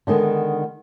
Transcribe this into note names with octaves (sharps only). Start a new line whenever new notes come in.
D3 D#3 G#3 B3